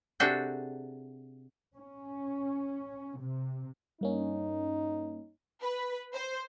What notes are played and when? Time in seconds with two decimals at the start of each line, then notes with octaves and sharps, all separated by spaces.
0.20 C3 D4 F#4 G#4 A4 G5
1.76 C#4
3.19 C3
4.01 G2 A#3 C#4 D#4
5.62 B4
6.13 C5